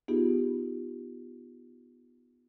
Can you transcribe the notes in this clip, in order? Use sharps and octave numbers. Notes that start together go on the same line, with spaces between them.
B3 D#4 F4 G4 G#4